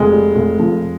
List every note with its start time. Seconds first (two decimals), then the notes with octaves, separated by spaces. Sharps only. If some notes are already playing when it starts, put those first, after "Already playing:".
Already playing: F1 G#3
0.12 G3
0.35 F1
0.59 F2